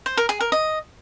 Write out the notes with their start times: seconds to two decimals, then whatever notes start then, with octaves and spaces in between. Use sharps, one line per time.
0.06 C5
0.17 A#4
0.29 G#4
0.40 A#4
0.52 D#5